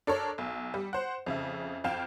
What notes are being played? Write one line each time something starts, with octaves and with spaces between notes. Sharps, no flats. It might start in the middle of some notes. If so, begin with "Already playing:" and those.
D4 A4 A#4 C#5
B1
G3
C5 F#5
F2 C#3 E5
F2 F5 G5 E7